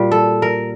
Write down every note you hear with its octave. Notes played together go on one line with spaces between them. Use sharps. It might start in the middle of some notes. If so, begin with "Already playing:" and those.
Already playing: A#2 G3
A4
A#4